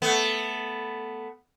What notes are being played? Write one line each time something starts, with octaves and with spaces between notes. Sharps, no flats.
A3 B3